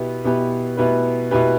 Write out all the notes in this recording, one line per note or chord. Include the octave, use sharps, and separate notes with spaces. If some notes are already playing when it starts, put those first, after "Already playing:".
Already playing: B2 B3 E4 G4 B4
B2 B3 E4 G4 B4
B2 B3 E4 G4 B4
B2 B3 E4 G4 B4